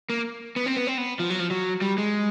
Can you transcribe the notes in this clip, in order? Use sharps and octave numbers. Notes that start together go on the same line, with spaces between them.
A#3
B3
C4
B3
C4
B3
F3
F#3
F3
F#3
G3
G#3